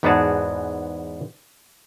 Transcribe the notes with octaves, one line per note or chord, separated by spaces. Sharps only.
E2 G#2 B3 F#4 G#4 A5